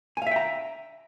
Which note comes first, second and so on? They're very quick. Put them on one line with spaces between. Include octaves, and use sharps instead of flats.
G#5 F5 E5 G5 A#5